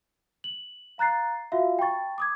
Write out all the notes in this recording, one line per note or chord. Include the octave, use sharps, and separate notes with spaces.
F#7
F5 A#5 F#6 A6 C7
F4 F#4 E5 F5
G5 A5 B5 C#6 A6
D6 D#6 G#6